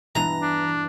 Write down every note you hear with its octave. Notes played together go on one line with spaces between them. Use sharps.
E2 G2 E3 A#5
D4